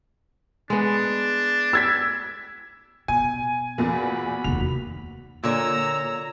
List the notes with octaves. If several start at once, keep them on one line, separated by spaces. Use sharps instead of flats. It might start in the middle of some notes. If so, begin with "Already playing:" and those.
G#3 B3 D4
E6 G#6 B6
B2 G#5
E2 A#2 A#4
F#4 B5
F1 D#2 F7
A#2 D3 A#3 C#5 D#5 A#5 E6